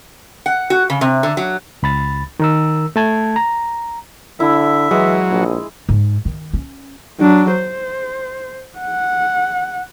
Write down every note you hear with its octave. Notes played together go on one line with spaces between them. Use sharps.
F#5
F#4
C#3
C3
D3
F#3
C#2 B5 A6
D#3 A#4 E6
A3 A5 G#6
A#5
D3 E4 E5
E3 F#3 G#3
A#1
G#2
D#3
C#4
F#3 D4
C5
F#5